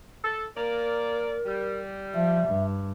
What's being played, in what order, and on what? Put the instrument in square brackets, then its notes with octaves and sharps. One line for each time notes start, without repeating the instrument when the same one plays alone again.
[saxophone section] A4
[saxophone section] A#3 D5 [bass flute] A#4
[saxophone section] G3
[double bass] F3 [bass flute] E5
[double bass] G2